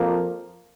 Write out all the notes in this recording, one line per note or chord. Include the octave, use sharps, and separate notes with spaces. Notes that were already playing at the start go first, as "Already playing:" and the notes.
Already playing: F2 F3 A#3